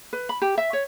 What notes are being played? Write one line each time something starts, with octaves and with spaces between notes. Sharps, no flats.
B4
B5
G4
E5
C#5